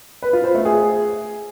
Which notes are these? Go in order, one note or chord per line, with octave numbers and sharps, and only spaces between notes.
B4
F4
C5
A3
G#4